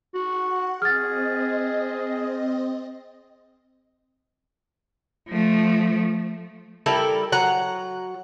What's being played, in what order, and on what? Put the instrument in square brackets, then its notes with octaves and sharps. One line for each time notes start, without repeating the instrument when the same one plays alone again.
[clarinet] F#4 [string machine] F#5
[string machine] C4 D#5 [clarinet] G#4 [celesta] F6 A6
[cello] F3 A3
[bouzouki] G3 E4 A4 A#4
F#3 F#5 A#5